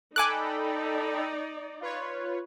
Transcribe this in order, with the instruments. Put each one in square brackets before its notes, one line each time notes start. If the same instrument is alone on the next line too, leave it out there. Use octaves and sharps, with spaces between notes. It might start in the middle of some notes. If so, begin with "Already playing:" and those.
[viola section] D#4 D5 [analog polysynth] A4 G5 B5 [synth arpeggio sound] G#5 D6 F#6
[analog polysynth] F4 B4 C#5